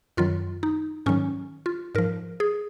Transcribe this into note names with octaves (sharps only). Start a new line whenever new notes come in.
F#2 D#3 F#3 F4
D#4
G#2 D#3 F#3 C#4
F4
G#2 F3 A#4
G#4